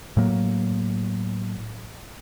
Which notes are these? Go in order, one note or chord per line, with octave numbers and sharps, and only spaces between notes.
A2 F#3 A#3